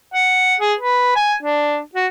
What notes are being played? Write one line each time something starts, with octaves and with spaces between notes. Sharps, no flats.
F#5
G#4
B4
G#5
D4
F#4